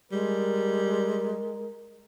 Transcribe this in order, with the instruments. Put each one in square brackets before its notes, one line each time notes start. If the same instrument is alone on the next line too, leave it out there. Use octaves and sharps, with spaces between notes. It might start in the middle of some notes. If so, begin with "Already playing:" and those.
[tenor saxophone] G3 [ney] G#3 [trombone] A#4